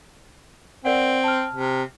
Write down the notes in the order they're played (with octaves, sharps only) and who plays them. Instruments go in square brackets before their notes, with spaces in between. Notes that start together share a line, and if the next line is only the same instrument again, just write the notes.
[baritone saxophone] C4 [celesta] A#4 D5 F#5
[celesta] A5 F6
[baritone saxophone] C3